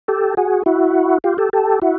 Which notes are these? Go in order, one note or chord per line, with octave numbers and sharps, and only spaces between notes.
G4 A4
F#4 G#4
E4 F#4
F4 G4
G4 A4
G4 A4
E4 F#4